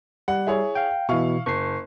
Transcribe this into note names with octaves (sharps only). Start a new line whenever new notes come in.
G3 F#5
E4 G#4 C#5
F5 G5
B2 E3 E4 F5 C#6
F#1 C#6 C7